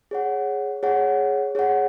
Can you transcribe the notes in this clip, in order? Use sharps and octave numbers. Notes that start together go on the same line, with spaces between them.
G#4 C#5 F#5
G#4 C#5 F#5
G#4 C#5 F#5